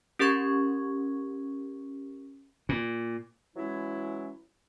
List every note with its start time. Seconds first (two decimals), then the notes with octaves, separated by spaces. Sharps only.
0.19 C#4 G4 A#4 C#6 G#6
2.69 A#2
3.56 E3 F#3 G#3 C#4 E4